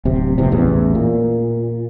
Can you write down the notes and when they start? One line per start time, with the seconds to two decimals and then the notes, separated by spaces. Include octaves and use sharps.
0.05 D1 C3
0.38 F1 E2 C3
0.52 A1 E2
0.95 A#2